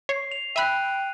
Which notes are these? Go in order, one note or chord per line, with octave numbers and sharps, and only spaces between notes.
C#5 C7
F7
E5 G5 B5 F#6 D#7